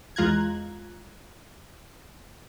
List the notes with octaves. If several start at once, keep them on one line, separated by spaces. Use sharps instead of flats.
E2 G#3 F4 A#5 F#6 G#6